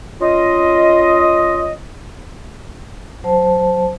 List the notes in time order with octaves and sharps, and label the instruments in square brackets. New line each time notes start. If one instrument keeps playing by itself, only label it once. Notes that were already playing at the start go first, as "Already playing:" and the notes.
[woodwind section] C#4 F4 D#5
[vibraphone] F#3 C5 A5